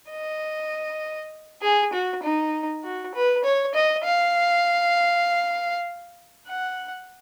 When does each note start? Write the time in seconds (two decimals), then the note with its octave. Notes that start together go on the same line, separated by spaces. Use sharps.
0.11 D#5
1.62 G#4
1.93 F#4
2.23 D#4
2.84 F#4
3.15 B4
3.44 C#5
3.75 D#5
4.05 F5
6.48 F#5